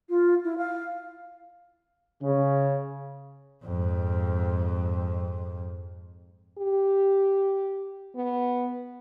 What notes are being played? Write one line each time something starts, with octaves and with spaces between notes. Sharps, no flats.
F4
E4
F5
C#3
F2 G#2
G4
B3